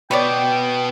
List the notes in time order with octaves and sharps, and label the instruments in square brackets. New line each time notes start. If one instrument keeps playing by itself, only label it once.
[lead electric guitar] B2 B3 [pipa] B4 C#5 D5 [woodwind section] G5